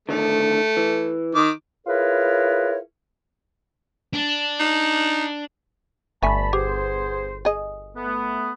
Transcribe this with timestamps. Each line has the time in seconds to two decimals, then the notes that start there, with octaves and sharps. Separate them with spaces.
0.09 A2 D3 D#3 A3
0.77 E3
1.35 D#3 D6
1.87 E4 F4 G#4 A#4 B4 C#5
4.13 D4
4.60 D#4
6.23 G1 A3 D4 E5 G#5 A5 B5
6.53 B3 G4 G#4 C5
7.45 G#4 D#5
7.97 A3 B3